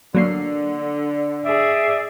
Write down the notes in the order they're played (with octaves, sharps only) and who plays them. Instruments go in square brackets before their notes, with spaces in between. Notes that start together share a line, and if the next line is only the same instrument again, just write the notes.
[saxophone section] D3 [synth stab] F#3 A#3 C7
[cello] G#4 D5 [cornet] E5